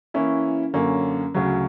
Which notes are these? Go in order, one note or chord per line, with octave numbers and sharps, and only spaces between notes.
E3 A#3 C#4 E4
F#2 D3 A#3 C#4
D2 C#3 F#3